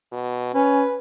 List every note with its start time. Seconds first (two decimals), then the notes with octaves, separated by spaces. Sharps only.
0.12 B2
0.55 C#4 B4